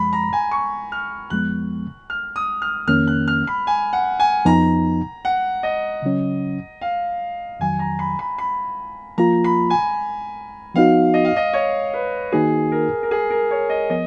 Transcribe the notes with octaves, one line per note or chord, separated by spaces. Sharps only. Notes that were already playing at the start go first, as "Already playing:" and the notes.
Already playing: F#2 F3 G#3 B5
A#5
G#5
C#6
F6
F2 F3 G#3 B3 F#6
F6
D#6
F6
F2 D#3 A#3 C#4 F6
F#6
F6
B5
G#5
F#5
G#5
F2 F3 B3 D#4 A#5
F#5
D#5
C#3 F#3 C#4
F5
F2 D#3 F#3 G#5
A#5
B5
B5
B5
F3 A#3 F4 A#5
B5
G#5
F3 B3 D#4 F#4 F5
D#5
F5
D#5
C#5
B4
D#3 A#3 D#4 F#4 G#4
A#4
A#4
G#4
A#4
C#5
D#5
F3 B3 D#5